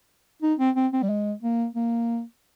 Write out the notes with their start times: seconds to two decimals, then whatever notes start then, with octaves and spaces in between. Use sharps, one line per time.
0.42 D#4
0.59 C4
0.75 C4
0.93 C4
1.02 G3
1.09 G#3
1.43 A#3
1.75 A#3